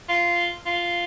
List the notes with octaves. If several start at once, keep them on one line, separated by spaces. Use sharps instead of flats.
F4
F4